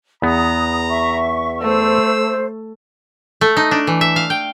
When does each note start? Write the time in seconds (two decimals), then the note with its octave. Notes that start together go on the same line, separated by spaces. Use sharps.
0.22 E2 B3 A#5 D#6
0.89 E5 C#6
1.61 A3 C5 E6
3.41 A3
3.57 D#4
3.71 D4
3.87 E3
4.01 E5
4.16 F5
4.30 G5